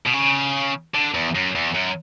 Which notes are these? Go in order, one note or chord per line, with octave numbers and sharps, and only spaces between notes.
B2
C#3
D3
E2
F#2
E2
F#2